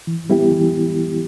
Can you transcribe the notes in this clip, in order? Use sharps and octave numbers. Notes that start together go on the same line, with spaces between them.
E3
G3 B3 E4 G4
E3